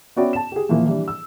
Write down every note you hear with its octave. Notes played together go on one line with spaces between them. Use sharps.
B3 C#4 F#4 D5 E5 G5
A5 E7
G4 G#4
A#2 E3 F3 A#3
E3 G3 D4
E6